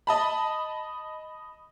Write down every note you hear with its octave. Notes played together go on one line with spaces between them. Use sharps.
D#5 A5 B5